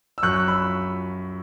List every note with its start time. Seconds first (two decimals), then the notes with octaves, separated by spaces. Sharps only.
0.18 E6
0.23 F#2 C#6 F#6
0.48 B5 E6